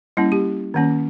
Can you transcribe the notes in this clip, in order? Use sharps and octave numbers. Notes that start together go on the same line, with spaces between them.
G3 A#3 C#4 E4
G4
D#3 A#3 C#4